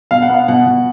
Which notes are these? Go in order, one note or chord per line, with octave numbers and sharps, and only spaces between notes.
B2 F5
F#5
B3 F5
B2 F#5
B2